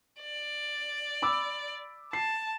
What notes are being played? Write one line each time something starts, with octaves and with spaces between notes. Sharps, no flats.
D5
B5 D6 E6
A5 C7